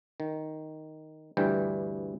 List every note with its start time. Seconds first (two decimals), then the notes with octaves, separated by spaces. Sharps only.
0.20 D#3
1.37 D2 G2 E3 G3 G5